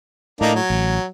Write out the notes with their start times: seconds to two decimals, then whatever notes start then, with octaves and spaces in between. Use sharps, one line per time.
0.41 A2 A#3 D4 D#4
0.55 F#3
0.70 A1